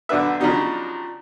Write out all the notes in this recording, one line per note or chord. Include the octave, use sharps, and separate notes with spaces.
B1 D3 D4 B4 E5
C#3 F3 F#3 D4 D#4 G4